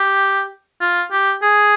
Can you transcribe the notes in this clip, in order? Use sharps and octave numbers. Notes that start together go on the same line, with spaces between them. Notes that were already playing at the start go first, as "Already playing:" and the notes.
Already playing: G4
F4
G4
G#4